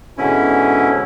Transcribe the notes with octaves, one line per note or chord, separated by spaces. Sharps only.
G#2 B2 D3 C#4 E4